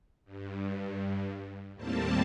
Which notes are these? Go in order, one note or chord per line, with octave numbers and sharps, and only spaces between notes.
G2
D#2 A2 G3 A#3 C4 A5